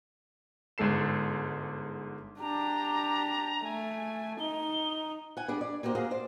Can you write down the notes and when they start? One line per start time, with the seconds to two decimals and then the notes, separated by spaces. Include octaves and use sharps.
0.78 G1 G#2 G#3 A4 C7 E7
2.40 D4 G4 A#5
3.64 A3 G#5
4.40 D#4 G7
5.37 F#5 G#5
5.48 G3 D4 G#4
5.61 D5
5.83 A#3 D#4 F#4 G4 C5
5.95 A#3 F#4 G#4 F5
6.11 C5 D5